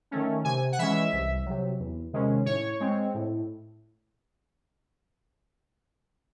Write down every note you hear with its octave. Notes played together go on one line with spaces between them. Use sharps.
D#3 A3 C#4
C3 G#5
F#5
E3 G#3 C#4 E5
C2
C3 F#3
E2
C3 D#3 G#3 C#4
A2 C#5
G#3 C4
A2